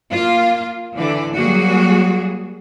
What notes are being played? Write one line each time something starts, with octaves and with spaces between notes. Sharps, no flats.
A#3 F4
D3 E3 D5
F#3 G3 A#3 F#4 G#4